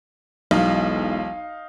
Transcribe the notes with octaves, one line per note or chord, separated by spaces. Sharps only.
E1 B1 D#4 F5